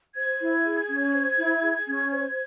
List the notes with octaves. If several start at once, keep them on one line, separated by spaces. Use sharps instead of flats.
C5 G#6
E4
G#4
C#4
C5
E4
G#4
C#4
C5